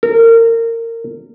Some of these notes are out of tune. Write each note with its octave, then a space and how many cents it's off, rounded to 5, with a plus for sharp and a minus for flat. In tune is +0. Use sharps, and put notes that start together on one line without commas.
A#4 -25